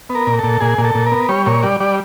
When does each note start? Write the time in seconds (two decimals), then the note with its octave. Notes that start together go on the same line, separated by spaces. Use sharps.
0.09 B3
0.15 A#4
0.27 A#2
0.39 A#2 A4
0.61 A#2 G#4
0.78 A#2
0.84 A4
0.95 A#2
1.06 A#4
1.12 B3
1.29 G3 C#5
1.46 A#2 C#5
1.63 G3 D5
1.80 G3 D5